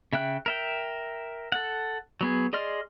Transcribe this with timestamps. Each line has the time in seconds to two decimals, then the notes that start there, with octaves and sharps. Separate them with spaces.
0.13 C#3 E5 G5 F#6
0.46 A#4 E5 G5
1.52 A4 F#5
2.21 F#3 B3 G#4
2.53 G#4 D5 D#5 C6 F6